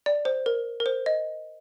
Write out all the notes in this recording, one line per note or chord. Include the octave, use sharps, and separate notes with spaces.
D5
C5
A#4
A#4
C5
D#5